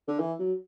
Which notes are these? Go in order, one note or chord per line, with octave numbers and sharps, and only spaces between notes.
D3
E3
F#3